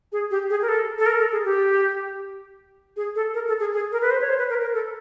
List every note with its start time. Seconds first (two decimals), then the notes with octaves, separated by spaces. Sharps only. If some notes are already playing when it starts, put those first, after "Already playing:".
0.12 G#4
0.31 G4
0.50 G#4
0.62 A#4
0.69 A4
0.99 A4
1.06 A#4
1.19 A4
1.32 G#4
1.45 G4
2.96 G#4
3.15 A4
3.34 A#4
3.48 A4
3.60 G#4
3.73 G#4
3.92 A#4
4.02 B4
4.11 C5
4.21 C#5
4.29 C5
4.39 B4
4.49 A#4
4.61 A#4
4.73 A4